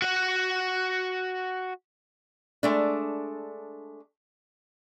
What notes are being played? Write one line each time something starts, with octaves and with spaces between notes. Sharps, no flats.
F#4 F#5
G#3 A3 D4